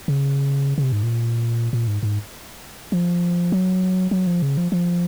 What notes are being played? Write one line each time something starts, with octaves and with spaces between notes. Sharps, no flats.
C#3
C#3
C3
G#2
A#2
A#2
G#2
G#2
F3
F#3
F#3
F3
C#3
F3
F3